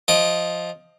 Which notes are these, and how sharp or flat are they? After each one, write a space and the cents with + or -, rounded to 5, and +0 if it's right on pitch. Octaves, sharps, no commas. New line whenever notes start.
F3 +0 D#5 +0 D6 +25